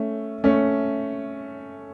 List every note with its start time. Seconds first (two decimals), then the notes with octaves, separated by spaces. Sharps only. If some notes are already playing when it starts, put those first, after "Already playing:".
Already playing: A3 C#4
0.44 A3 C#4